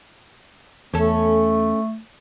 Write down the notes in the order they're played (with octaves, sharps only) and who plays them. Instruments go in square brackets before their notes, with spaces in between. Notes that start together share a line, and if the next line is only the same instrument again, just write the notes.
[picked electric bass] E2 [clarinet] A3 [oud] C#4 A4